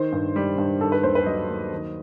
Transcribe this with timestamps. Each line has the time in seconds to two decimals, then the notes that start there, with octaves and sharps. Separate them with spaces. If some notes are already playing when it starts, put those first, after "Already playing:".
Already playing: D#3 C5
0.12 G2
0.36 G3
0.58 G2
0.81 D#3 A4
0.92 B4
1.03 D#2 C5
1.15 B4
1.26 F#3 D#5
1.49 D#2
1.72 D#3